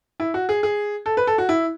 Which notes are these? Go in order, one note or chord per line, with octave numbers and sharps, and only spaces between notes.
E4
F#4
G#4
G#4
A4
B4
A4
F#4
E4